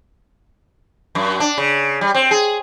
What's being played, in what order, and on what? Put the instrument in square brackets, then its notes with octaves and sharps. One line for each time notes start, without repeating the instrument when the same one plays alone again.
[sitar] F#2
D4
C#3
G3
C4
G#4